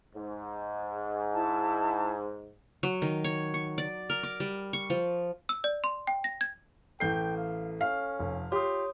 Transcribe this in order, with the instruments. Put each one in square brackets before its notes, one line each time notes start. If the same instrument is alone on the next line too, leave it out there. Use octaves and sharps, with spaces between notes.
[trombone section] G#2
[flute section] E4 A5
[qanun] F#3
D#3
C#5
C#6
D5
A#4
D6
G3
C#6
F3
[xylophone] E6
D5
C6
G5
A#6
G#6
[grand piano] A1 G6 C7 [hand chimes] A4 [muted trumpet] G5
[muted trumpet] F5
[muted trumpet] C#4 [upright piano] F5
[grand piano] F1
[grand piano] F4 G4 [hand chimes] C#5 D#6 [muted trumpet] C6